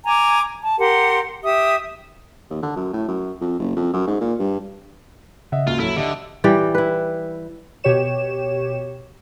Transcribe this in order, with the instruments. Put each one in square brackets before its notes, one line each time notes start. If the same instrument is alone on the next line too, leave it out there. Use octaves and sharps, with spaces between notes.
[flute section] G#5 A#5 D6
A5
G4 A#4 F#5 C6
G4 E5 D#6
[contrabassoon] D#2
D3
F#2
A2
F#2
F2
F#1
F2
F#2
G#2
A#2
G2
[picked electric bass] C#3 [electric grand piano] D#5 E5 F#5
[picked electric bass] D1 G#1 A#3 [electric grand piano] C#2 F#4 [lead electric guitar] F4
[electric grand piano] F#3 A4 [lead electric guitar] E4
[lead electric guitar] D3 [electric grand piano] G4 D#5 E5
[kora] E3 G3 G4 D5
E4 B4
[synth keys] B2 G4 C#5 E7